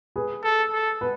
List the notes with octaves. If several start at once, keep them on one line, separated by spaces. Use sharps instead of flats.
G#4 B4
A4
A4
B4